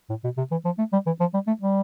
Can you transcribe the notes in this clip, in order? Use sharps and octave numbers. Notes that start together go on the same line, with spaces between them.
A2
B2
C3
E3
F3
A3
G3
E3
F3
G3
A3
G3